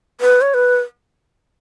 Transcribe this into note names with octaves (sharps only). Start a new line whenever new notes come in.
B4
C#5
B4